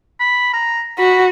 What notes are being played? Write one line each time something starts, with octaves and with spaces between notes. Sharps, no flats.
B5
A#5
F#4 B5